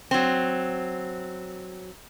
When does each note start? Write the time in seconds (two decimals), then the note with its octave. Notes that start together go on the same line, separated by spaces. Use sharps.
0.11 F#3 C4